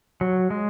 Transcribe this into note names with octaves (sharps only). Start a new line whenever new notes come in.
F#3
G#3